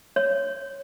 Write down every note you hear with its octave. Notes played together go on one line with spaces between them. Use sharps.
C#5